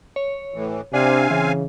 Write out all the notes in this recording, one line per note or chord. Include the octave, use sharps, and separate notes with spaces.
C#5
A2 E3
C3 C4 D4 F5 G#5
C#3 E3